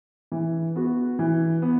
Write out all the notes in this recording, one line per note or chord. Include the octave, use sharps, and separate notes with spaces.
E3
B3 F#4
E3
B3